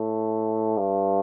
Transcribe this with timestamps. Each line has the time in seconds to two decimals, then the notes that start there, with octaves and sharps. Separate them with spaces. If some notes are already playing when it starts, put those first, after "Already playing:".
Already playing: A2
0.77 G2